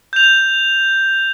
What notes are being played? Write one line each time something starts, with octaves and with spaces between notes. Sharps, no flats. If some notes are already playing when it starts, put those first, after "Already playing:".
G6 F7